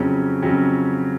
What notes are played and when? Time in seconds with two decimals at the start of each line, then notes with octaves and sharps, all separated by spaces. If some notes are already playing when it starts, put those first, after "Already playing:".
Already playing: F2 C#3 F#3 C#4
0.42 F2 C#3 F#3 C#4